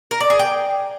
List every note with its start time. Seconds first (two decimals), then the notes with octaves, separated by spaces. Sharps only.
0.11 A#4
0.21 D5
0.30 G#4
0.39 G5